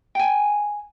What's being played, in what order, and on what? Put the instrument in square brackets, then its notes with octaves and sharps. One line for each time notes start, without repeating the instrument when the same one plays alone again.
[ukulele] G5 G#5